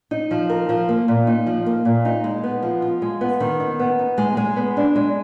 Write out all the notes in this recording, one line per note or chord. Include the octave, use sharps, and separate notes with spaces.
D#4
F3
A#4
F3
A#3
A#2
D#4
F3
A#3
A#2
D#4
G#3
B3
F3
F4
G#3
B3
D#3
D#4
B3
D#4
G#3
G#3
B3
D4
G#3